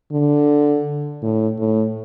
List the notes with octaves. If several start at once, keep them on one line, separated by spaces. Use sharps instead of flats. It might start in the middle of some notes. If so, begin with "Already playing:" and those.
D3
A2
A2